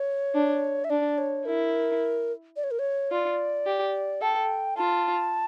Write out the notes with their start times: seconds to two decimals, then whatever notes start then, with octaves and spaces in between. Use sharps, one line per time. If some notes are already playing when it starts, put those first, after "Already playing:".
Already playing: C#5
0.35 D4
0.84 E5
0.90 D4 D5
1.18 C#5
1.45 E4 A#4
2.56 D5
2.64 C#5
2.71 A#4
2.79 C#5
3.12 F4 D5
3.67 G4
4.21 A4 G5
4.77 F4 A5